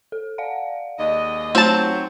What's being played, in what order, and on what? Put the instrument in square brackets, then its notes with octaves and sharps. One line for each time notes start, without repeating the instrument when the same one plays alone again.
[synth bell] A4
D5 F5 F#5
[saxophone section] D#2 G#3 D#5
[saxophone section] F#3 [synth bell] A3 D#4 F4 [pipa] C4 A5